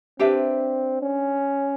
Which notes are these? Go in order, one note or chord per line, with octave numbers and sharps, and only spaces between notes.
C4 D4 G4 B4 E5
C#4